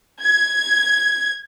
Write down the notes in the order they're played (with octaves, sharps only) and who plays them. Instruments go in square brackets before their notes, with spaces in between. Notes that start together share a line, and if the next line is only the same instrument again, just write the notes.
[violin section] G#6